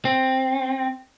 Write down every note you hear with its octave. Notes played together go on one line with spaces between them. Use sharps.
C4